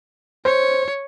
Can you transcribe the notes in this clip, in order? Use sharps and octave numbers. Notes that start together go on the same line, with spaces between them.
C5 C#5